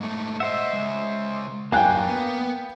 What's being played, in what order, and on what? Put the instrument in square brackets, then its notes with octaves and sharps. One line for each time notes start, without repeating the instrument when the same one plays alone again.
[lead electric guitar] G#2 A3
[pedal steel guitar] C5 E5 [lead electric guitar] D#5 F#5
[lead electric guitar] C#3 G#3
[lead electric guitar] F#2 D4 [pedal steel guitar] A#3 F5 F#6 [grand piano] G5 G#5
[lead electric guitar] B3